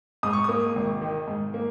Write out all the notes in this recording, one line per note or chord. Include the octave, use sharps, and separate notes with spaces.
G#2 D#6
C#6
A#3 D#6
G#1
D#3
G#2
A#3